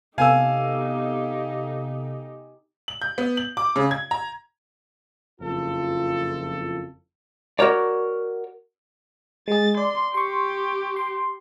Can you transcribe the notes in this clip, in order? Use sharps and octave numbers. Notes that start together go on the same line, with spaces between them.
C3 B3 D#4 G4 A4 F5 G#5 E6
F#7
G6
B3
F#7
D6
C#3
G#6
A#5
F#1 F2 F4 A4
F#4 A#4 C#5 D5
G#3 G#4 A6
D5 C6
G4 C6 C#6
C6